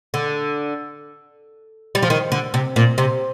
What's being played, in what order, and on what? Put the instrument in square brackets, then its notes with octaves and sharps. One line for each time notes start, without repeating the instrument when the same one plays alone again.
[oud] D3
G3
F3
D#3
D3
C3
A#2
C3